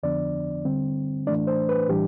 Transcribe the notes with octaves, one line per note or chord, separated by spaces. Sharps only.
F2 D3 F3 B3 D4 D5
D3 G3 C4
A2 E3 A3 D4 D5
C5
B4
A2 E3 G3 D4 G4